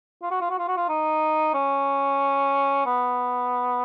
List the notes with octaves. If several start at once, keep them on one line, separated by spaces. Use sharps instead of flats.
F4
F#4
F4
F#4
F4
F#4
F4
D#4
C#4
B3